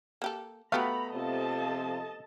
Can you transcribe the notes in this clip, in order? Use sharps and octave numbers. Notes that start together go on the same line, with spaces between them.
A#3 G4 A4
A3 B3 F#4 G4 F5 A#5 B5
C3 F3 A4 D#5 A5